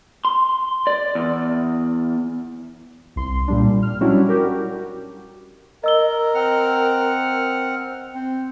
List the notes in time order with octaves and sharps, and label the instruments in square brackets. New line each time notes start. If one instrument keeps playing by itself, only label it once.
[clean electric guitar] C6
D5
E2
[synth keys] C2 C6
A#2 G3 D4
F6
F#3 G3 C#4 D4 E4 F#4
F#4 G4 A#4
[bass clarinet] A#4 [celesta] D#5 E6 G7
[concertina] C4 F#5 F6
[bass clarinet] C4